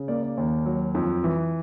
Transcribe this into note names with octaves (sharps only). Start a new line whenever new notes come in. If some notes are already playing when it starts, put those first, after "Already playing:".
Already playing: C#3
A#3 D5
D5
D#2
F#3
F2
E3